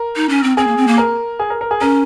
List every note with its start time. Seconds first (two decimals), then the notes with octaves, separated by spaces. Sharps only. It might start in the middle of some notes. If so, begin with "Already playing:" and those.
Already playing: A#4
0.16 D#4
0.29 C#4
0.43 C4
0.57 C4 G#4
0.67 A#3
0.77 C4
0.87 A#3
0.98 A#4
1.39 G#4
1.50 A#4
1.61 A#4
1.71 G#4
1.81 C#4 A#4